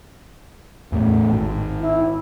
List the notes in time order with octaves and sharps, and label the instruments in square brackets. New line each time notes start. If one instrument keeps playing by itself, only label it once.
[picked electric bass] E2 A2 A3
G#1
[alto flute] E4